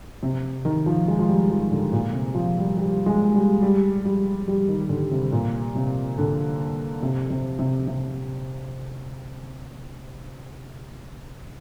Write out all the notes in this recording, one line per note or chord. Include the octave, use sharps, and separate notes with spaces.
C3
D#3
F3
G#3
F3
G3
F3
D3
A#2
C3
F3
G3
G3
G#3
G3
G3
G3
G3
D#3
D3
C3
A#2
C3
D3
C3
C3
C3
C3